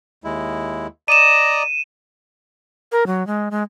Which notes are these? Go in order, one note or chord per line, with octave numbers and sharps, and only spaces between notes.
D#2 G#3 E4
D5 D#5 A#5 D#7 E7
A#4
F#3
G#3
G#3